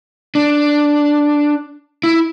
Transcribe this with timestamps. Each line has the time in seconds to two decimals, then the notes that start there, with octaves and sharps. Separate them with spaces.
0.35 D4
2.03 E4